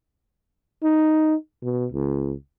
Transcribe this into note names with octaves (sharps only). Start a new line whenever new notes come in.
D#4
B2
C#2